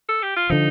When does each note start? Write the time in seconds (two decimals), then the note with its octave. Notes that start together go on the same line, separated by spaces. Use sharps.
0.09 A4
0.23 G4
0.37 F4
0.50 D3 F3 D#4